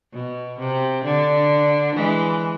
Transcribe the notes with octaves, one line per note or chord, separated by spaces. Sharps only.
B2
C3
D3
E3 G#3